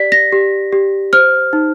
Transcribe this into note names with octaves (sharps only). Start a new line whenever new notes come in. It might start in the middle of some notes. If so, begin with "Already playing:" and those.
Already playing: G4 D5 B6
A#6
G4
G4
C5 F6
D#4